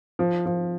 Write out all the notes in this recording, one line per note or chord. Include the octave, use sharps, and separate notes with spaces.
F3
F3